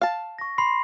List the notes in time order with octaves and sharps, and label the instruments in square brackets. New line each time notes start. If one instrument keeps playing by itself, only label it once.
[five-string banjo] F5 A5
[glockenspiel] C#6 A#6
B5 C6 C7